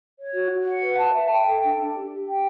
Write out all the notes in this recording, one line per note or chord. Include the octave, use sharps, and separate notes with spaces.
C#5
F#4
F#4
F#5
B4
A5
E5
G5
A4
D4
D4
G4
G4
G5